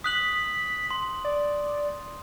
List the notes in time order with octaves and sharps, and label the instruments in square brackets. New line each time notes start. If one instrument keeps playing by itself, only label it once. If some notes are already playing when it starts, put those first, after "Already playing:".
[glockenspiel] D#6 F#6 F#7 [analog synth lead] B6
[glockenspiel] C6
[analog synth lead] D5